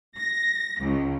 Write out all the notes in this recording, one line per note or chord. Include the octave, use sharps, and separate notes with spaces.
A#6
C#2